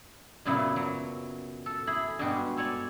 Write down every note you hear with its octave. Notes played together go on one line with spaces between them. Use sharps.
F#2 A#2 C#3 F#3 B3 E4
F#3
A4
E4 G#4 B5
G2 B2 G#3 F#4 G4
A4 C#5 D5 G#5